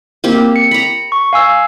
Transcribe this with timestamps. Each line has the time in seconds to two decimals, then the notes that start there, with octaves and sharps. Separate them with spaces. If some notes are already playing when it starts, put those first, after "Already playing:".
0.24 A#3 C4 G4
0.56 C#7
0.71 A#5 B5
1.12 C#6
1.33 F5 G#5 E6